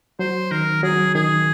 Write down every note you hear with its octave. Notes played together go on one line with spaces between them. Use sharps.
F#3 C5
D#3 A#4
F#3 G#4
D#3 G#4